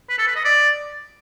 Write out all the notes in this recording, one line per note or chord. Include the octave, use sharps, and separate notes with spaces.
B4
A4
B4
D#5
D5